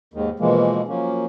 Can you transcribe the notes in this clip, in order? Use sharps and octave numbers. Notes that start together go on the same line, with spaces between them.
D#2 G#2 D#3
B2 E3 F3 G#3 A#3
F3 F#3 A#3 C#4